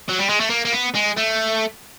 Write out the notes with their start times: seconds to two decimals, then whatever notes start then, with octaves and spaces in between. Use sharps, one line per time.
0.09 F#3
0.19 G3
0.29 G#3
0.40 A3
0.50 A#3
0.65 A#3
0.72 B3
0.95 G#3
1.18 A3